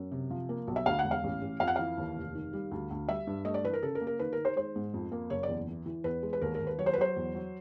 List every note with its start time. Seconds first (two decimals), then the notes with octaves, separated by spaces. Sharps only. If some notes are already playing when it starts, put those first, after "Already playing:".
Already playing: F#2
0.12 C3
0.30 F3
0.49 A#3
0.67 B1
0.76 E5
0.86 D2 F5
0.99 F#5
1.04 E1
1.11 F5
1.24 A1
1.42 A1
1.60 F2 F5
1.68 F#5
1.76 E3 F5
1.98 D#2
2.16 F1
2.35 D#3
2.53 G3
2.71 D2
2.91 D2
3.08 G3 E5
3.27 G2
3.45 A3 D#5
3.54 D5
3.64 E3 B4
3.73 A#4
3.83 C#3 A4
3.95 A#4
4.01 A#3
4.07 A#4
4.19 D#3 B4
4.33 D#3 A#4
4.45 C5
4.56 G#3 C5
4.76 G#2
4.94 F2
5.12 A#3
5.30 F#1 C#5
5.43 D5
5.49 E2
5.68 E3
5.86 E3
6.04 E2 B4
6.23 G#3
6.33 B4
6.41 D#2 A#4
6.55 A#4
6.60 D#2
6.67 B4
6.78 F#3 C#5
6.86 C5
6.93 B4
6.98 F#3 C5
7.17 E2
7.35 F#3